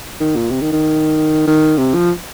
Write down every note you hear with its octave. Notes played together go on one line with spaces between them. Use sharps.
D#3
A#2
C3
D#3
D#3
D#3
C3
F3